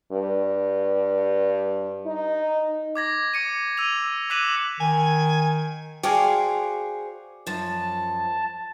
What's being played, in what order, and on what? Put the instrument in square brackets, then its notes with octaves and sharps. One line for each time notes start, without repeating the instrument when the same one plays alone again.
[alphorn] G2
D#4
[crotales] D6 G#6 A#6
D6 C#7 D#7
E6 D#7 F7
D6 F#6 B6 D#7 E7 F#7
[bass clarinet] D#3 [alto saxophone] G#5
[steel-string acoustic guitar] F#4 G#4 C5 [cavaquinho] D5 F5 G#5 [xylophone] G5
[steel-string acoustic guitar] F#2 F3 [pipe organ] A5